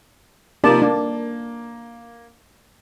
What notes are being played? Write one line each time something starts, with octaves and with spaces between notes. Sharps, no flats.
C3 F3 A#3 D#4 D5 A5
A#3 D4